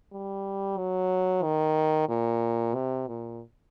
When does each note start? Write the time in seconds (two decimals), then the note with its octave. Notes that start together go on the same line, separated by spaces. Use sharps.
0.12 G3
0.77 F#3
1.43 D#3
2.09 A#2
2.75 C3
3.07 A#2